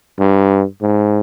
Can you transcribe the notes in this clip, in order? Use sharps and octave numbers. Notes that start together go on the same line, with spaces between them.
G2
G#2